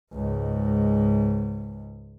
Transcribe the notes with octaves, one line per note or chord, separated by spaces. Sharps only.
C#2 G#2